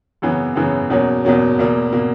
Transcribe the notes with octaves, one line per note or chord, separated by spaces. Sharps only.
F#2 C#3 E3 B3
F#2 C#3 E3 B3
E2 B2 F#3 A#3 C#4
E2 B2 F#3 A#3 C#4
E2 B2 A#3
B2 A#3